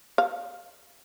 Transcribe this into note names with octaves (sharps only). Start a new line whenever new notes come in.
F5